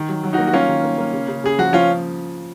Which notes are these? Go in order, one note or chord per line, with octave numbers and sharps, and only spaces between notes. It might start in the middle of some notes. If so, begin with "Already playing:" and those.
Already playing: D#3
F#3
F#3
D#4 F#4
A#3
F#4
A#3 C#4 F4
D#3
A#3
A#3
C#3
C#3
C#3 G#4
F3 F#4
F3 C#4 F4